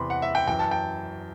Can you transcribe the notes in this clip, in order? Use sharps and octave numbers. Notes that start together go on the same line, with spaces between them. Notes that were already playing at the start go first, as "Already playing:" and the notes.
Already playing: E2 C3 E3 B5 C6
F#5
E5
G5
F#2 E3 G5
A5
G5